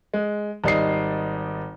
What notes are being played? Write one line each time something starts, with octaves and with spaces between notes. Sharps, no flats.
G#3
G#1 G3 D#4 D5 D#5 C7